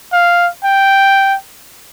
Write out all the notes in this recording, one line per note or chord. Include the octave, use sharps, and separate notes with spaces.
F5
G5